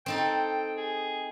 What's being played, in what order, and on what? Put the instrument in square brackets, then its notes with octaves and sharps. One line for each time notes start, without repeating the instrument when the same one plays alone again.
[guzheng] C4 D#4 A4 [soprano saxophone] G5
[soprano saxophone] G#4